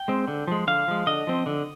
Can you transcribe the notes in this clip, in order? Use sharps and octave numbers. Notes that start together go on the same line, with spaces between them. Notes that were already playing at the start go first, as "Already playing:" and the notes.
Already playing: G5
G#3 C4
D3
F3 G#3
D3 F5
F3 G#3
D3 D#5
F3 C4
D3